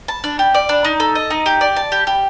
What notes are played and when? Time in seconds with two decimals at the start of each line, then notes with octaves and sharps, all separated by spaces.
0.08 A5
0.24 D4
0.39 G4
0.54 D5
0.69 D4
0.85 D#4
1.00 A4
1.15 D#5
1.30 D#4
1.46 G4
1.61 D5
1.76 A5
1.92 G4
2.07 G4